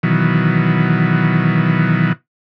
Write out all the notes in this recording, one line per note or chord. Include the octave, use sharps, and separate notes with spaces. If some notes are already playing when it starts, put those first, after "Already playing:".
B2 D#3 E3 F#3